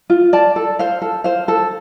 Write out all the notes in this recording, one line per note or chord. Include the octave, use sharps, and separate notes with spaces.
F4
D5 A5
A4
C5 F5
A4
C5 F5
A4